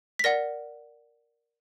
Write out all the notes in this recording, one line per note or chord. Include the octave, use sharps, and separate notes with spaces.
B6
A#4 D5 F#5 A#6